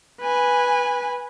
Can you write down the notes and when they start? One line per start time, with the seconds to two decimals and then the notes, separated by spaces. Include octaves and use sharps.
0.21 B4 G#5